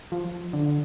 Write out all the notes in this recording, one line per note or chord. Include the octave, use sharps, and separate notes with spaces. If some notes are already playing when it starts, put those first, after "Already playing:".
F3
D3